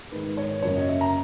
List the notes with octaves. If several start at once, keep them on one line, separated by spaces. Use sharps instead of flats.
G#2 D#3 G#3 B4
C#5
F#2 C#3 F#3 A#3 C#4 C#5
D#5
E5
A#5